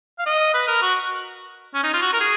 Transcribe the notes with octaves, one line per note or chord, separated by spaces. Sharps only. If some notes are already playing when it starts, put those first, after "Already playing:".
F5
D#5
B4
A#4
F#4
C#4
D#4
F4
F#4
A#4
G#4